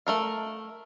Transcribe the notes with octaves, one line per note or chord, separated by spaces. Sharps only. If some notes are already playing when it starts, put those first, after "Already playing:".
A3 A#4 F5